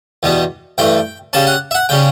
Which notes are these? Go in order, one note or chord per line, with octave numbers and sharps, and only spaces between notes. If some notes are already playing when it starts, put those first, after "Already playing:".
E2 B2 G3 B3
G2 E3 A3 G5
C#3 G3 C#4 A5
F#5
E5
F#5
C#3 G3 C#4 G5